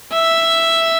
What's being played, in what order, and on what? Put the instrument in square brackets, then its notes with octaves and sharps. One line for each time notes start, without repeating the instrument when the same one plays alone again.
[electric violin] E5